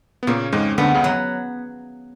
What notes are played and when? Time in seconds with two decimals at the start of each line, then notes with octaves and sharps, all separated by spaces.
0.23 B3
0.27 A#2 C#3 A#3
0.52 F2 G#2 G#3
0.78 D2 D3 B3
0.95 C#2 C#3
1.04 F#3